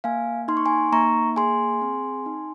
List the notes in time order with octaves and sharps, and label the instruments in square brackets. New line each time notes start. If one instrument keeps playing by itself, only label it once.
[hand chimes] A#3 F5 G#5
D#4 C6
C#6
G#5 C6
A#3 A#5 C#6
G#4 G#5 C6
C4
D#4